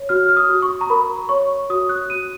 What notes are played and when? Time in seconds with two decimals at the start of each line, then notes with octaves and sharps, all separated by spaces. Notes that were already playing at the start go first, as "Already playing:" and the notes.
Already playing: C#5
0.09 F#4 F6
0.28 F6
0.37 D#6
0.49 F#4
0.62 C#6
0.81 A#5
0.90 A#4 B5
1.29 C#5 C#6
1.70 F#4 D#6
1.89 F#6
2.10 F#4 D#7